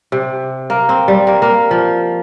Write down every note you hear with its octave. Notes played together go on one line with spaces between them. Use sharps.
C3
A#3
C4
G3
A#3
A#3
F3